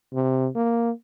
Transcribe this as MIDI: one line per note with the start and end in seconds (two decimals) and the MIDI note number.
0.13 0.48 48
0.55 0.91 58